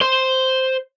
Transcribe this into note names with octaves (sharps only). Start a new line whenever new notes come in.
C5 C6